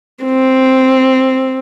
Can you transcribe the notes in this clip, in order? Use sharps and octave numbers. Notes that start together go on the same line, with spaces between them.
C4